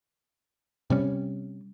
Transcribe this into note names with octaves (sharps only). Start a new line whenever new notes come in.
C3 G3 C#4